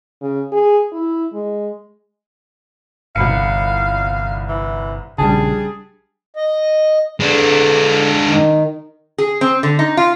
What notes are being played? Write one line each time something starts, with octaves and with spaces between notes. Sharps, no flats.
C#3
G#4
E4
G#3
G1 C2 F5 B5 C#7
E3
A#1 C#3 G3 D4 G#4 A5
D#5
D3 G#3 D4
D#3
G#4
C4
D3
D#4
F4